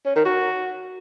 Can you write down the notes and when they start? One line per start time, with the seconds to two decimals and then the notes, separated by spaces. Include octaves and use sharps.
0.06 C#4
0.16 D#3
0.25 F#4